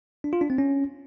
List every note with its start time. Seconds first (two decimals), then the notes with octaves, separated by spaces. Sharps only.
0.24 D4
0.33 F4
0.41 D4
0.50 C4
0.58 C#4